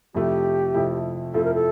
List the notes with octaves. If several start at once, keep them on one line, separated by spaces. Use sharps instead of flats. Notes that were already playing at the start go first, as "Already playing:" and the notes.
F2 C3 F3 A3 E4 G4
F2 C3 F3 A3 E4
F2 C3 F3 A3 E4 A4
A#4
A4